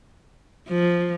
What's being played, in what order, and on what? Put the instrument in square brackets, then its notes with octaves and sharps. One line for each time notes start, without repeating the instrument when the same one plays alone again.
[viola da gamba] F3